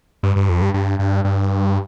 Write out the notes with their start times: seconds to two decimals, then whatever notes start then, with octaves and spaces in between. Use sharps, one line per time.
0.23 G2
0.36 G2
0.49 F2
0.62 G2
0.74 G2
0.99 G2
1.24 G2